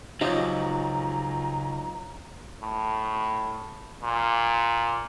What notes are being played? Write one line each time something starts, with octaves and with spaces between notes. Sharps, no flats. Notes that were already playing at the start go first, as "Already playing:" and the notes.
C#2 F3 F#3 D#4 G4 D#5 A#5
A2
A#2